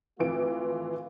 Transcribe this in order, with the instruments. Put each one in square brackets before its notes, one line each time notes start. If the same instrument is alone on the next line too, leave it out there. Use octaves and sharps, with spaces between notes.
[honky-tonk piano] G#1 E3 D7 [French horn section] A3 F4